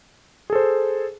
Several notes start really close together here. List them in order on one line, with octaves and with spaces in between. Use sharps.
G#4 A4 C5